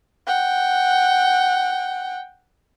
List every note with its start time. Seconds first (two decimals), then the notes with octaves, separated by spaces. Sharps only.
0.27 F#5 G5